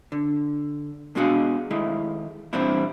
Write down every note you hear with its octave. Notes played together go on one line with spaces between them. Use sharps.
D3
B2 G#3 D4 F#4 G#4 F5
D#3 G#3 A3 E4
A#2 E3 G3 C4 D4 E4